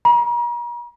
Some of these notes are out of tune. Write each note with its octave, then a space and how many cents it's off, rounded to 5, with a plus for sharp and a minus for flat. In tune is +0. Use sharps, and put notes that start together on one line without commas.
A#5 +40